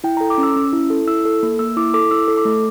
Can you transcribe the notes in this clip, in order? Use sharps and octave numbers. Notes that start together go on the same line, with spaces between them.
E4 G5
A4 A#5
D6
C#4
E6
C#4
E4
A4
E4 E6
A4
A#3
A#3 E6
E4 D6
A4 D6
E4 E6
A4
D6
A3